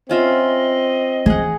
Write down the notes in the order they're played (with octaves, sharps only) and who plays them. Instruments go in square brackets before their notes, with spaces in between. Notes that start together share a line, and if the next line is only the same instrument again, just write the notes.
[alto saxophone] C4 [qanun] C#4 F4 E5 [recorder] D#5
[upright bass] E3 [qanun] G#4 F#5